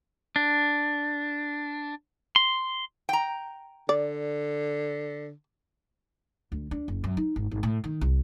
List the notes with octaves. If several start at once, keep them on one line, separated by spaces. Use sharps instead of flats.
D4
C6
G5 A#5
D3 D5
D2
D4
F#1
F#2
D#4
G#1
G#1
A2
D#3
C2